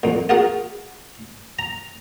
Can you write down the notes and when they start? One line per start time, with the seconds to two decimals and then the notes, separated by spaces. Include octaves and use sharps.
0.03 F2 A#2
0.29 F4 F#4 G#4 A#4 F#5
1.59 A#5